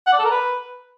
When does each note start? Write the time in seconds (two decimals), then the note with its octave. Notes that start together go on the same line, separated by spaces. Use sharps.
0.07 F#5
0.13 D5
0.19 A4
0.25 A#4
0.31 B4